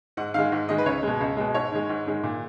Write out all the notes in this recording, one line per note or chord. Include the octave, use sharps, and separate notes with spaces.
G#2 F#5
D#3 G#3 F5
G#2
D#3 G#3 D#5
B4
C#2 C#5
B2 G#3
C#2
B2 G#3
G#2 C#5
D#3 G#3
G#2
D#3 G#3
A#2